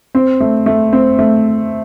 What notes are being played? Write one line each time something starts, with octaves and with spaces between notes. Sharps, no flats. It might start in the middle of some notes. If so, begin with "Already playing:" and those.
C4
A3
A3
C4
A3